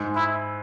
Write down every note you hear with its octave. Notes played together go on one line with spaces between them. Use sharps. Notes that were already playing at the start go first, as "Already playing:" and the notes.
Already playing: G#2
E4